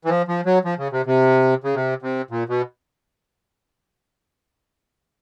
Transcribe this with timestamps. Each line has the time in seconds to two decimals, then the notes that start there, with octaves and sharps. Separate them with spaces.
0.05 E3
0.09 F3
0.28 F3
0.46 F#3
0.65 F3
0.78 C#3
0.92 C3
1.06 C3
1.64 C#3
1.75 C3
2.02 C3
2.31 A#2
2.49 B2